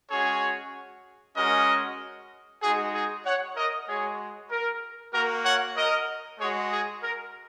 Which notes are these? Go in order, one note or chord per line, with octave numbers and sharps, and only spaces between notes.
G#3 C#4 F#4 G#4 C#5
G#3 C#4 F#4 A#4 D#5
G#3 D#4 F#4 G#4
G#4
C#5 F#5
A#4 D#5
G#3 F#4 G#4 C#5
A#4
A#3 F#4 A#4
C#5 F#5
A#4 D#5
G#3 F#4 G#4 C#5
G#4
A#4